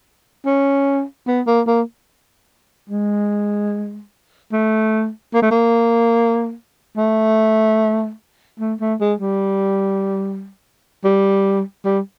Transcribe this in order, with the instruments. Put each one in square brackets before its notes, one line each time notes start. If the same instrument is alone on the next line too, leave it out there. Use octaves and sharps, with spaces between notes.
[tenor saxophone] C#4
B3
A#3
A#3
G#3
A3
A#3
A3
A#3
A3
A3
A3
G#3
G3
G3
G3